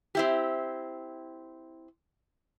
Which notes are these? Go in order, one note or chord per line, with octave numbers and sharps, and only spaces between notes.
C4 E4 G4